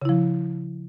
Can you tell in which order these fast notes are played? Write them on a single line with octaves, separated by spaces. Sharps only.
C#3 E4 F3